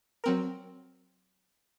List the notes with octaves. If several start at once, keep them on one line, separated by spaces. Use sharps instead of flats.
F#3 C4 A#4